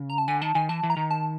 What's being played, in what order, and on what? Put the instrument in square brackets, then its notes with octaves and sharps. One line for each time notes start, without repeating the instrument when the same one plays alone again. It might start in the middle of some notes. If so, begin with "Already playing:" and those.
Already playing: [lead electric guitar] C#3
[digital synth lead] A#5
A5
[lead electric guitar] D3 [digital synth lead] G#5
[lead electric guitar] D#3 [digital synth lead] A5
[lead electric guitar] D#3 [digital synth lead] G#5
[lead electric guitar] E3 [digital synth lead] A5
[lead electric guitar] E3
[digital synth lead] A#5
[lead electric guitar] D#3
[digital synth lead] A5